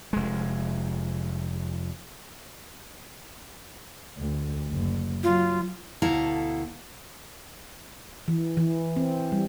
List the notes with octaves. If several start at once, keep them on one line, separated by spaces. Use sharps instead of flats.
F1 G#3
D2
F#1
F#3 F4
D2 B2 E4 A4 F5 A#5
E3
E3
C4
G3